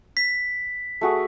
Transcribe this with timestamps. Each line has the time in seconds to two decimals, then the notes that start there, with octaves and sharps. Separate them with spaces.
0.17 B6
1.01 A3 F#4 G#4